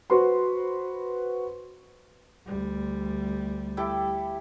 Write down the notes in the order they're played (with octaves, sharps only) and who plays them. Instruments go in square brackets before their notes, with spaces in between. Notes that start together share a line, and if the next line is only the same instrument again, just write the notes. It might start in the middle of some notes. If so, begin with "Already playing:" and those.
[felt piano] F#4 B4 C5 C6
[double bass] D2 G3
[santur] E4 G4 A4